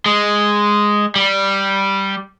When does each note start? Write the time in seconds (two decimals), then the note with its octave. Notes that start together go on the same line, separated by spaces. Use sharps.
0.06 G#3
1.16 G3